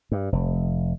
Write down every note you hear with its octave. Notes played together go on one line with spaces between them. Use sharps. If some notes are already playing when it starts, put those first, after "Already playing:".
G2
F1